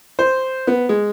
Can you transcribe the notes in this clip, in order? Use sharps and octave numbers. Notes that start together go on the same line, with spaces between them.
C5
B3
G#3